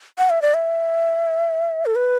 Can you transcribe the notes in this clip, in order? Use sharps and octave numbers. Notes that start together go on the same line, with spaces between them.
F#5
E5
D5
E5
A4
B4